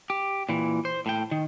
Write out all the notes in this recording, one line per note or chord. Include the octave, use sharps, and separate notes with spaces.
G4
A#2 E3
C5
A2 G5
D#3